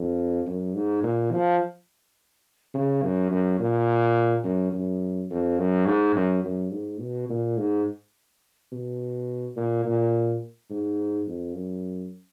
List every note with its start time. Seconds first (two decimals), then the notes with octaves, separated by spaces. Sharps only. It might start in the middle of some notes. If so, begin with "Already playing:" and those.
Already playing: F2
0.46 F#2
0.75 G#2
1.04 A#2
1.32 F3
2.74 C#3
3.03 F#2
3.31 F#2
3.59 A#2
4.44 F#2
4.73 F#2
5.30 F2
5.59 F#2
5.87 G#2
6.16 F#2
6.44 F#2
6.72 G#2
7.00 B2
7.29 A#2
7.58 G#2
8.72 B2
9.56 A#2
9.85 A#2
10.70 G#2
11.28 F2
11.56 F#2